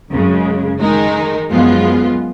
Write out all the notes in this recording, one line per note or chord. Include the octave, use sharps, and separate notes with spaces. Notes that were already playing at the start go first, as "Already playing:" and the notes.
F#2 C#3 G#3
D#3 G#3 D#4 A#4
F#2 F3 G#3 B3 F4